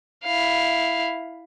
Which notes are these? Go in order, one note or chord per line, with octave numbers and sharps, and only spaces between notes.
E4 F5